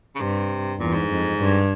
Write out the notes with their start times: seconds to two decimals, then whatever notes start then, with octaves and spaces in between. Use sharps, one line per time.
0.15 C#3
0.20 G2 C3
0.79 E2 A#2
0.94 G#2
1.10 F2
1.39 G2